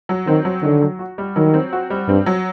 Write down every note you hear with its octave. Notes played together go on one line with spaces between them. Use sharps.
F#3
D#3 C4
F#3
D3 D#3
F#3
F#4
G3
D#3 F#3
C4
F#4
G3
G2 C4
F#3